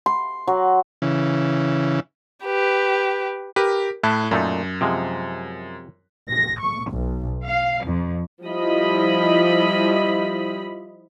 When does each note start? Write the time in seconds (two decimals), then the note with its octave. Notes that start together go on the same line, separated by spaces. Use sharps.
0.06 C6
0.47 F#3
1.02 C#3 E3
2.44 G4 B4
3.56 G4 A#4 B4
4.03 A2 E4 A5 F#6
4.31 F#2 A#2 A3 D#4
4.81 C3 F3 G#3
6.30 A#6
6.59 C#6
6.91 B1
7.46 F5
7.84 F2
8.44 F3 G3 E4 D#5 B5